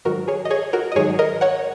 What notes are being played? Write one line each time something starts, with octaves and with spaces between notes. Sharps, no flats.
G#2 D#3 F#3 F#4 A#4
G#4 C#5
D#5
G#4 C#5
F#4 A#4
D#5
G#2 D#3 F#3 G#4 C#5
A#4 D#5
C#5 F#5